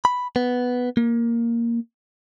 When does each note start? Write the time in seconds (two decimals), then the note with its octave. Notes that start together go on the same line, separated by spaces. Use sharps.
0.05 B5
0.36 B3
0.97 A#3